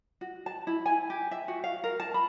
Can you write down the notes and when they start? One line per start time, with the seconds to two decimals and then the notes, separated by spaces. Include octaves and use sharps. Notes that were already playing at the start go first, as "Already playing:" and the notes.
0.21 F#4
0.46 A5
0.67 E4
0.86 G#5
1.10 G4
1.31 E5
1.48 F#4
1.64 F5
1.84 A#4
2.00 A5
2.14 B5